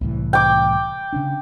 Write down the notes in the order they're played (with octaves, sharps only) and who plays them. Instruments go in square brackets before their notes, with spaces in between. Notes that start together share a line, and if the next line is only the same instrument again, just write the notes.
[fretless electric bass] C2 A2 E3
[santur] G5 D6
[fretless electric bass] C#3 C#4 D4